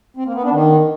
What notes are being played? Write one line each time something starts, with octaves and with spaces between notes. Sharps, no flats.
C4
A#3
B3
D4
D#3